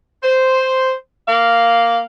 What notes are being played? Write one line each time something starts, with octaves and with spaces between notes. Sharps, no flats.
C5
A#3 F5